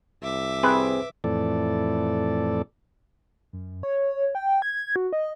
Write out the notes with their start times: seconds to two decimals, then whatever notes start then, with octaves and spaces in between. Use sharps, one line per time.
0.22 C2 E5 D6
0.63 C4 G#4 B4 C5
1.24 F2 A2 E3 A4 D5
3.53 F#2
3.83 C#5
4.35 G5
4.62 G#6
4.96 F#4
5.13 D#5